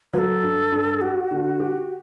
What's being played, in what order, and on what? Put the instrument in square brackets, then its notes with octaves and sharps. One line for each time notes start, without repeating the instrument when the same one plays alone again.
[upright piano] F#3 [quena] B4
[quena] A4
[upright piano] G2
G2
[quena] F#4 [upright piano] G4
[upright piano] D3
G4